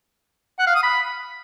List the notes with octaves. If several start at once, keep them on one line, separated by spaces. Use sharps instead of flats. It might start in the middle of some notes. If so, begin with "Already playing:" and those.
F#5
F5
D#6
B5